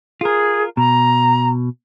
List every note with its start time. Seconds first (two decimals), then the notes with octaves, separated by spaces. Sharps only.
0.21 F4 G#4 A#4
0.77 B2 A#5